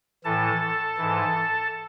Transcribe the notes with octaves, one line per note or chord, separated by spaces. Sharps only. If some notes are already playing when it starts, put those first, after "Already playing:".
A2 E3 A4 A5
G#2 E3